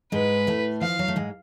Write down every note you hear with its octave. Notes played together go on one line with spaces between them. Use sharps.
G#2 G#3 B4
A2 A3
F3 F5
F#3
A3
G#2 G#3